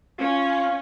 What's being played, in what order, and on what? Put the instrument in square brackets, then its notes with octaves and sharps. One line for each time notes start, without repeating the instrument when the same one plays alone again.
[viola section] C#4 [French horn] F4